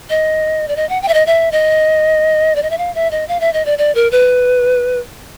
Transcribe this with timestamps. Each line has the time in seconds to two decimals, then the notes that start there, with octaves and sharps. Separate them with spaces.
0.10 D#5
0.68 D5
0.76 D#5
0.89 F#5
1.02 G5
1.08 E5
1.14 D#5
1.27 E5
1.52 D#5
2.56 D5
2.63 D#5
2.70 E5
2.78 F5
2.95 E5
3.11 D#5
3.28 F5
3.41 E5
3.53 D#5
3.66 D5
3.78 D5
3.95 A#4
4.12 B4